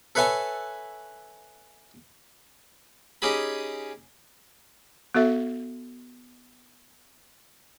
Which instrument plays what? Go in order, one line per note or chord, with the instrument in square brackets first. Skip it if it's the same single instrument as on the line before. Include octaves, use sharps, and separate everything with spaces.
[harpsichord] A4 B4 C#5 E5 G#5 A5
C#4 D#4 G4 G#4 B5
[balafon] B3 F#4 A4 E5